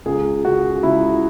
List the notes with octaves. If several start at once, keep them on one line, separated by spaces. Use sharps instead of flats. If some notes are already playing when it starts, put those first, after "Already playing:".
C#2 G#4
C#3 F#4
C#2 E4